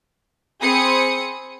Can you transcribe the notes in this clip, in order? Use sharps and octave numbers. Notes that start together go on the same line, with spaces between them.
C4 G#4 B5 D#6 C#7